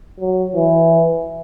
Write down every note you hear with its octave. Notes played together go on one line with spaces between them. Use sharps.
F#3
E3